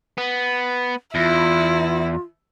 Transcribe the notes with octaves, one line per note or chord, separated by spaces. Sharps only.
B3
E2 E4 F4